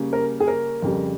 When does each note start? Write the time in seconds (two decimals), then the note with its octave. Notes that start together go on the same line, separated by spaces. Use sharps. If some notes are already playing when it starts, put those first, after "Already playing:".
Already playing: C#3 G3 A#3 C#4
0.13 A#4
0.40 G#4
0.47 A#4
0.82 F2 C#3 G3